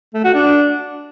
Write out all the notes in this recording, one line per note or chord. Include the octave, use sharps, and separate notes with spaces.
A3
F#4
D4